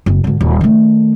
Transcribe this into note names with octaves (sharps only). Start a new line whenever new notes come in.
F#1
G#1 D3
D#1
D#3 A3